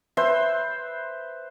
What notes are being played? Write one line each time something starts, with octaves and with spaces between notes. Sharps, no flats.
B4 C5 E5 C6